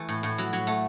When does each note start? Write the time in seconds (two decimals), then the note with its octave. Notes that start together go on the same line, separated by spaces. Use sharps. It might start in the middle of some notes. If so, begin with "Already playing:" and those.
Already playing: E3 A3
0.09 A2
0.23 A2
0.38 F#3
0.53 F#3
0.67 A3